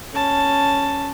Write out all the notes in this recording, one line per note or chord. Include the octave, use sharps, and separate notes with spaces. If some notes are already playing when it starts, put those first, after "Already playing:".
C#4 A5